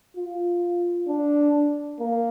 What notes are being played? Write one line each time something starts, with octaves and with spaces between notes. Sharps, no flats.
F4
D4
A#3